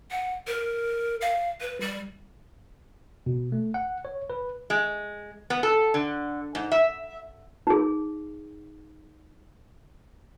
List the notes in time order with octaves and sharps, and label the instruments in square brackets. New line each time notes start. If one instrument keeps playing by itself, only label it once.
[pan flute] F#5
A#4
F5
B4
G3
[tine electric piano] B2
A3
F#5
C#5
B4
[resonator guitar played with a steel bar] G#3
B3
A4
D3
G#2
E5
[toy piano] D#4 G#4